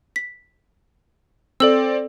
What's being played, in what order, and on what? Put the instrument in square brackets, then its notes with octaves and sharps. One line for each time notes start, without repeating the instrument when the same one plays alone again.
[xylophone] B6
[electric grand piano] C4 D5 [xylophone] A4 E6